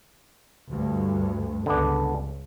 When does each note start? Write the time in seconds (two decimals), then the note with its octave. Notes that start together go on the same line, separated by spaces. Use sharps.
0.70 D2 G2
1.66 C#2 D3 B3 D4